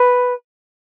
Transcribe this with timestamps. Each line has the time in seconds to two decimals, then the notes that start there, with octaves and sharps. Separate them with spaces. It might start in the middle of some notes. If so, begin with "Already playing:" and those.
Already playing: B4